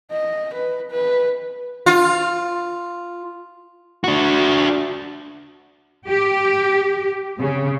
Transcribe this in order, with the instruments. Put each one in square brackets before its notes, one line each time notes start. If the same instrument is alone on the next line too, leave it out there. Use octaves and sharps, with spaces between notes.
[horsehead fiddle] D#5
B4
B4
[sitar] F4
[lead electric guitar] D4 F#4
[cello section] G4
C#3